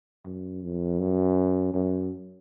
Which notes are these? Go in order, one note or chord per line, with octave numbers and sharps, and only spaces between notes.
F#2
F2
F#2
F#2